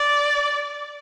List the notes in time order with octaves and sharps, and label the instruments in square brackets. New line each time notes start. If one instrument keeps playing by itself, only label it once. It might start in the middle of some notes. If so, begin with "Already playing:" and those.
Already playing: [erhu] D5